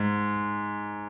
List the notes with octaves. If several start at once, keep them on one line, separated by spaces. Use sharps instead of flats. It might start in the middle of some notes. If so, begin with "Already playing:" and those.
Already playing: G#2